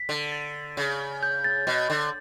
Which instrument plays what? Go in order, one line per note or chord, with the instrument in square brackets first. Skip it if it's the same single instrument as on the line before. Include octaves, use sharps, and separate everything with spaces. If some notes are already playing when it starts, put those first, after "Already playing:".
Already playing: [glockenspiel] B6
[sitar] D3
[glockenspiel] A6
A6
[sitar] C#3
[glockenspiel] G6
A6
[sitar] B2
D3